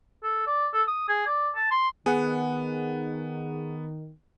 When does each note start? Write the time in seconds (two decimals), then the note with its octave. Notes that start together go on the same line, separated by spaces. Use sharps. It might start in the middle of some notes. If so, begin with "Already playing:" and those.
0.23 A4
0.47 D5
0.74 A4
0.88 D#6
1.09 G#4
1.26 D5
1.56 A5
1.71 C6
2.06 D#3 B3 G#4 F#5